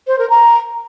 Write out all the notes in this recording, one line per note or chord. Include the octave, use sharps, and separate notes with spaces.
C5
A#4
A#5